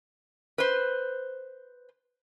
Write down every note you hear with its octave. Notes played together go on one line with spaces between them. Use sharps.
B4 C5